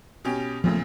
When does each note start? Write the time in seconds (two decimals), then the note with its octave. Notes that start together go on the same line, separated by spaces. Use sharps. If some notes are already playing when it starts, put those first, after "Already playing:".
0.24 B2 C#4 G4
0.64 E2 A#2 C#3 F3 F#3 A3